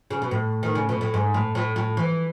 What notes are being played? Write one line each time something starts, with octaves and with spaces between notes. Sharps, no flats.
C#3
B2
A2
D#3
C#3
B2
A2
G#2
A2
A2
A2
E3